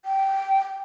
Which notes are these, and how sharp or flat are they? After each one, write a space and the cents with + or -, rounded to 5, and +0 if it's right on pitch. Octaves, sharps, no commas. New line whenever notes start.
G5 -15